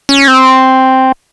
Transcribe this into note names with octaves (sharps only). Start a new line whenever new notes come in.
C#4
C4